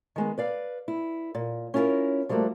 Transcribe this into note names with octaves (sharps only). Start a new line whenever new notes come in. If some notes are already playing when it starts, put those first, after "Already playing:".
D#3 G#3 B3
B4 D5 F5
E4
A#2
C#4 E4 F4 G4 A#4
F3 G3 A3 A#3 F#4